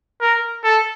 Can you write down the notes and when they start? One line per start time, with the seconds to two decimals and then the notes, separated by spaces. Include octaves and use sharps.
0.21 A#4
0.64 A4